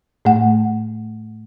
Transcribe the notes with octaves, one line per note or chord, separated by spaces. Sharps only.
A2 A3 F#5